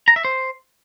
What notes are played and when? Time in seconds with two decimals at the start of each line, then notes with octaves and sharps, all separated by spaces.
0.08 A#5
0.16 E5
0.25 C5